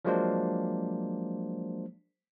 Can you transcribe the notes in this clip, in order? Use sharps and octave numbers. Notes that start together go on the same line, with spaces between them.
F3 F#3 G#3 A#3 D4 C5